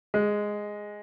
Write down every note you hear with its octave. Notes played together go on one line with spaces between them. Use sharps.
G#3